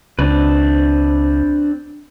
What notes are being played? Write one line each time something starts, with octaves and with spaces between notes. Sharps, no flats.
C#2 C4 D4 B4